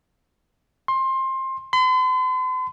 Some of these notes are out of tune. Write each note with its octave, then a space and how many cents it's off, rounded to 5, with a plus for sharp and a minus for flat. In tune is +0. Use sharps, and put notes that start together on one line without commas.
C6 +20
C6 -45